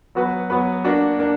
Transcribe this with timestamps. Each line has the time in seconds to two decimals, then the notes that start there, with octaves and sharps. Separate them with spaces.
0.15 F#3 B3 F#4 B4
0.50 F#3 B3 F#4 B4
0.84 A#3 D4 F#4
1.19 A#3 D4